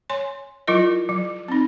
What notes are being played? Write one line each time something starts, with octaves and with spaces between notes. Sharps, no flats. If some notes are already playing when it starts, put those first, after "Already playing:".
C#5 G#5 C6
F#3 E4 F4 A#4 D#5
F#3
C4 D#4